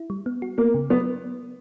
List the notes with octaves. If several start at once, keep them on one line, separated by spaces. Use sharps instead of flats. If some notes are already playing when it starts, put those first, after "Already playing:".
Already playing: E4
G3
B3
F#4
A#3 B3
C#3
F#3 B3